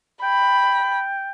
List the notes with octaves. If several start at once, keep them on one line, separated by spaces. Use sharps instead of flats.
G5 B5